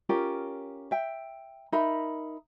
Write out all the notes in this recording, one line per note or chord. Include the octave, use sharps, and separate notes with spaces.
C#4 F4 G4 A#4
E5 G5
D#4 A#4 E5 B5